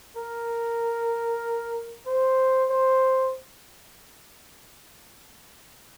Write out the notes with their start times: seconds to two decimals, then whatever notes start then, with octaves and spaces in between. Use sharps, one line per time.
0.17 A#4
2.07 C5
2.71 C5